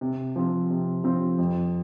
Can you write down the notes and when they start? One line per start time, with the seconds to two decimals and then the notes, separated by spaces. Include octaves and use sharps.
0.01 C3
0.36 F3 C4
0.70 C3
1.04 F3 C4
1.39 F2